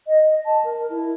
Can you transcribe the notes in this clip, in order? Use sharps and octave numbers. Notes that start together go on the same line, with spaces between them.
D#5
A5
A#4
E4